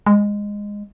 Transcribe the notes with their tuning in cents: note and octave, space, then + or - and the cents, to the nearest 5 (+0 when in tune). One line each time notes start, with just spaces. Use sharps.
G#3 -15